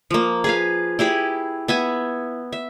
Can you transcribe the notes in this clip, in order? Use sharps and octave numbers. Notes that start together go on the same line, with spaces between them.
F3 A#3
G#4 B4 F5
E4 G4 G#4 B5
B3 E5 G#5
E5